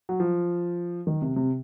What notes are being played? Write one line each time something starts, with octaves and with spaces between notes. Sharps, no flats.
F#3
F3
D#3
C3
C3